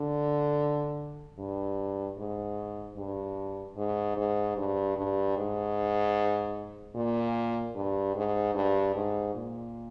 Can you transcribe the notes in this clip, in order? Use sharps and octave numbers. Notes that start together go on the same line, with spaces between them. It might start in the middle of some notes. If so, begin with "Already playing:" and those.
Already playing: D3
G2
G#2
G2
G#2
G#2
G2
G2
G#2
A#2
G2
G#2
G2
G#2
A#2